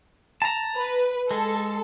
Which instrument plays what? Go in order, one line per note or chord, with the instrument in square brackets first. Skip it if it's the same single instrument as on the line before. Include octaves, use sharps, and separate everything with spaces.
[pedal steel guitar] A5 A#5
[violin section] B4
[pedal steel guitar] G#3 [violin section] A4